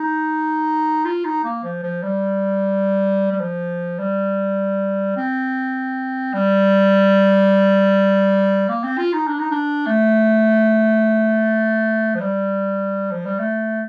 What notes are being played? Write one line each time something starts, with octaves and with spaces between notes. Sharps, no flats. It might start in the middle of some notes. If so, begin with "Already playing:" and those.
Already playing: D#4
F4
D#4
A#3
F3
F3
G3
G3
F3
G3
C4
G3
A#3
C4
F4
D#4
D4
D#4
D4
A3
F3
G3
F3
G3
A3